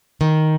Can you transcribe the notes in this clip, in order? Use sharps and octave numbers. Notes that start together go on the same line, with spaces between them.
D#3